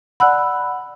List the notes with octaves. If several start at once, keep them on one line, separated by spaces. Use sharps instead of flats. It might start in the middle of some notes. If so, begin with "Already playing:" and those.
D5 F#5 A5 B5 E6 F#6